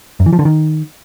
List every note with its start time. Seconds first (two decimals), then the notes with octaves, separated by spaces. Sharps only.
0.20 F#2
0.26 E3
0.33 F3
0.39 D3
0.45 D#3